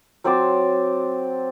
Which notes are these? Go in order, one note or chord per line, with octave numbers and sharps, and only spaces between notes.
F#3 C4 C5 D5